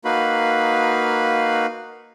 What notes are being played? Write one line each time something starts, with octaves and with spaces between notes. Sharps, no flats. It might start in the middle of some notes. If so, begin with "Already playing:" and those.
A#3 D#4 F#4 B4 F5 B5